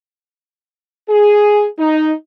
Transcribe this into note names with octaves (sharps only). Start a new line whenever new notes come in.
G#4
D#4